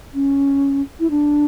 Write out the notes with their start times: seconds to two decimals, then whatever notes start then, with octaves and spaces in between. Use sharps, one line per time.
0.14 C#4
1.00 E4
1.10 D4